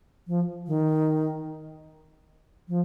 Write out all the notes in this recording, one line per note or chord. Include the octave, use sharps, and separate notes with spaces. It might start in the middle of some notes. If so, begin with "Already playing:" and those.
F3
D#3
F3